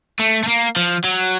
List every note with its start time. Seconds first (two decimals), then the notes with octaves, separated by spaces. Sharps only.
0.20 A3
0.43 A3
0.48 A#3
0.76 F3
1.04 F#3